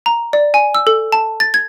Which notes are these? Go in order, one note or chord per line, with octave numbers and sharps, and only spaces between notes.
A#5
D5
G#5
E6
A4
A5
A6
G#6